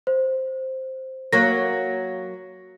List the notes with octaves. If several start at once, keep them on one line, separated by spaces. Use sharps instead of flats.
C5
F#3 A#3 A#6